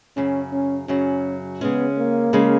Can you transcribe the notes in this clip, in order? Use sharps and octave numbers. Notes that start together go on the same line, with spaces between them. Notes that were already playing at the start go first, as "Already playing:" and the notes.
F#2 C#3 F#3 C#4
C#4
F#2 C#3 F#3 C#4
C#3 G#3 B3 C#4
A#3
C#3 G#3 C#4